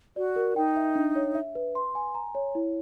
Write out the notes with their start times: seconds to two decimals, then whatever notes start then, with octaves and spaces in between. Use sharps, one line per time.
0.16 F#4 D5
0.36 A#4
0.56 D#4 G5
0.76 E5
0.96 D4
1.16 C#5
1.35 E5
1.55 B4
1.75 C6
1.95 G#5
2.15 A#5
2.35 C#5
2.55 E4